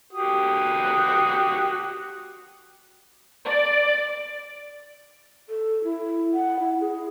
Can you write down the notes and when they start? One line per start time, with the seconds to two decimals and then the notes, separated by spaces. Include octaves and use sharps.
0.13 F#4 G4 D#6
3.46 D5
5.49 A4
5.84 E4
6.34 F#5
6.59 E4
6.80 G#4